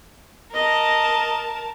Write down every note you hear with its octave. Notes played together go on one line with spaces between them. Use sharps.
A#4 D#5 A5